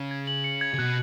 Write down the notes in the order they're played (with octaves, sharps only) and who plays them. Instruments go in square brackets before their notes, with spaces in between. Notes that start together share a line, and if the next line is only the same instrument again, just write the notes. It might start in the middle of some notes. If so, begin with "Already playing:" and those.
Already playing: [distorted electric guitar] C#3
[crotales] G#6
F#7
C#7
G#6
[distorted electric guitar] C#3
[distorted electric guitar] B2 [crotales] F#6